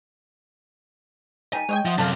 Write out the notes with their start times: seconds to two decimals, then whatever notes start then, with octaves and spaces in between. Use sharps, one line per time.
1.53 D#3 G3 G#5
1.69 G#3 C#5 D#5 G5
1.85 F3 E5 F#5 D#6
1.98 F#2 C3 F#3 A4 F5